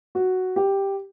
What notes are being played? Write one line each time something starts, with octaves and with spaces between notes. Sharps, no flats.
F#4
G4